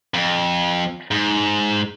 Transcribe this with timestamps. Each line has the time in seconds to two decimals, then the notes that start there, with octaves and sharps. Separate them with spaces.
0.14 F2
1.11 G#2